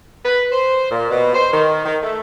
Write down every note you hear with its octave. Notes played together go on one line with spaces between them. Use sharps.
B4
C5
A#2
B2
C5
D#3
D#3
A3